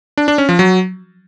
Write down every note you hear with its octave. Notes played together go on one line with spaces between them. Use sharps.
D4
D4
C#4
F3
F#3